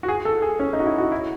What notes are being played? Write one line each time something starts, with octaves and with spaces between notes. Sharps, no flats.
F#4
G#4
A4
G#4
C#4
D#4
F#4
E4
F#4
E4